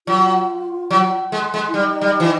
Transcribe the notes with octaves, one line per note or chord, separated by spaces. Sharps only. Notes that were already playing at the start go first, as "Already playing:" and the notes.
F#3 F4
F#3
G#3
G#3
E4
G3 D#4
G3
E3